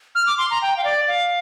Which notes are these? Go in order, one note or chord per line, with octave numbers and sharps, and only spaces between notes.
F6
D6
C6
A#5
G5
F5
D5
F5